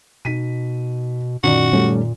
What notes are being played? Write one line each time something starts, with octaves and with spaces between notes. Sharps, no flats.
B2 D#4 B6 D#7
F#2 A#2 D#3 F#4 D5
G3 A3 C#4